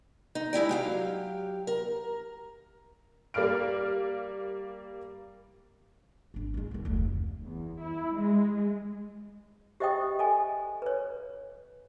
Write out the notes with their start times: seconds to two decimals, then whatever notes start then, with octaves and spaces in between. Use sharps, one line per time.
0.35 D#4
0.53 G#3 E4 G4 D5
0.69 F#3 G4 F5
1.67 A#4
3.34 G3 A#3 D5 F5 F6 D7
6.34 G#1 D4
6.54 F#3 G#3
6.71 E2 D#3
6.85 F1 D2
7.45 E2
7.82 E4
8.16 G#3
9.80 G4 C5 D#5 E5 G5 D#6
10.19 A4 D#5 G#5
10.82 B4 C#5